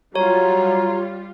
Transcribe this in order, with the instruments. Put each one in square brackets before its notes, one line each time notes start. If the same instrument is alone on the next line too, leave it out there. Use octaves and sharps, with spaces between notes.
[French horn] F#3 [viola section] G3 F4 [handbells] C#5 [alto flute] A#5